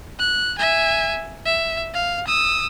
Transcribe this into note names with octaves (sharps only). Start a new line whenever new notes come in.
F#6
E5 G#5
E5
F5
D#6 E6